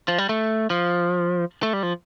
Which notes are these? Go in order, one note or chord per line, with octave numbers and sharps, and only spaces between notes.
F3
G3
A3
F3
A3
G3
F3